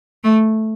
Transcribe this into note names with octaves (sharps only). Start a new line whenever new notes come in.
A3